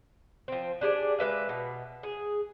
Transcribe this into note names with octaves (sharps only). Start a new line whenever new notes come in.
F3 C4
D4 G4 G#4 D5
G#3 B4 E5 F5
B2
G#4